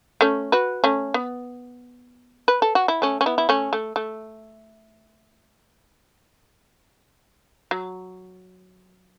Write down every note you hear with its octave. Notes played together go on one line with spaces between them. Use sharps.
A3 C#4
F#4 B4
A3 C#4
B3
B4
A4
F#4
E4
A3 C#4
C#4
B3 E4
E4
A3 C#4
A3
A3
F#3